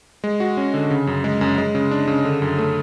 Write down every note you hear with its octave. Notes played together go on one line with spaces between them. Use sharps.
G#3
F#4
C#4
D3
C#3
F#2
G#3
F#2
G#3
C#3
D4
C#3
D3
F#2
A3